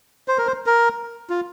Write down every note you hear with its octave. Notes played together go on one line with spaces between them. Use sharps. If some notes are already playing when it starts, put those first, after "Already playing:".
C5
A#4
C5
A#4
F4